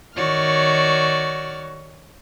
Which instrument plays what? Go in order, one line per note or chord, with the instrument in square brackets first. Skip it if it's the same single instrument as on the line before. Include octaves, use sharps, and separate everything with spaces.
[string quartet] D#3 F#4 C#5 D5 F6